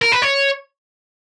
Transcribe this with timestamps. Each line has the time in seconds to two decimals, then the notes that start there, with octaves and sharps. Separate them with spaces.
0.02 A#4
0.12 B4
0.22 C#5